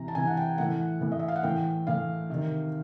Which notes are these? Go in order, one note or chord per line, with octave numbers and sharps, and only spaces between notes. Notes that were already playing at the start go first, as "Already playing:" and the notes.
Already playing: C3 E3 A#5
A5
C3 E3 G#5
F#5
G5
A2 E3 F#5
A2 E3
D#5
E5
F5
F#5
A2 E3 G5
A2 E3 F5
C3 D#3